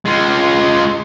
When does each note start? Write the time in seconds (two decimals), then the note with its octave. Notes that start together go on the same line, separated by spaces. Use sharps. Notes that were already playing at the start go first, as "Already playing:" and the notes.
0.05 G#3 F4